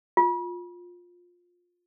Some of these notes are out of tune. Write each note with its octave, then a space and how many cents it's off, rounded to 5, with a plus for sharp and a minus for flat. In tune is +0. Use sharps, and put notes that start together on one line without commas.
F4 +15